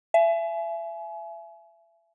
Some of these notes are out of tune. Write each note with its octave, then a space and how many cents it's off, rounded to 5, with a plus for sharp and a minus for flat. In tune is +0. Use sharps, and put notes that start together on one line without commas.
E5 +30 G#5 +35